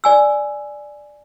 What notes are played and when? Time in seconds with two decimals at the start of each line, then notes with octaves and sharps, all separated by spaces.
0.04 D5 G#5 E6